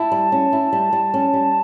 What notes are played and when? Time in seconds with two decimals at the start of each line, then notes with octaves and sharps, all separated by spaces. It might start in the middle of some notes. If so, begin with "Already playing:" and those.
Already playing: E4 A5
0.12 G3
0.32 C#4
0.53 E4
0.73 G3
0.93 G3
1.14 C#4
1.34 G3